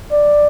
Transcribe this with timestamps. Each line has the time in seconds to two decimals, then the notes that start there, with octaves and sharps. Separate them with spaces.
0.12 D5